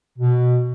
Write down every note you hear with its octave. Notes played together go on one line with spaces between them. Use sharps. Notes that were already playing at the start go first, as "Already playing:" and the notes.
B2